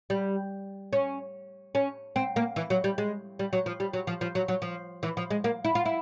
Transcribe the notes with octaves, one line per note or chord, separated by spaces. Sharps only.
G3
C#4
C#4
C4
A#3
E3
F#3
G3
G#3
G3
F#3
F3
G3
F#3
F3
F3
F#3
F#3
F3
E3
F3
G#3
A#3
E4
F4
E4